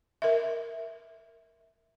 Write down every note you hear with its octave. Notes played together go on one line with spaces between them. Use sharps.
A#4 D#5 E5